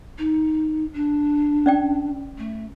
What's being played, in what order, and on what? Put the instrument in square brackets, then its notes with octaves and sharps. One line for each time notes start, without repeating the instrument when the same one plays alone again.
[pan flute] D#4
D4
[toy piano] C#4 D5 G5
[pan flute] A3